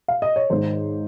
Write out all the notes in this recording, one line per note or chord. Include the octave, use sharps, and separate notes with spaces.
F5
D#5
C#5
G#1 G#2 D#3 C5